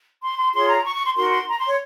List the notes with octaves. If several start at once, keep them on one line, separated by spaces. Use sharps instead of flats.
C6
C6
F4 G#4 C#5 C6
A#5
C#6
C#6
C6
D#4 F#4 A#4 C6
C6
A#5
C6
C#5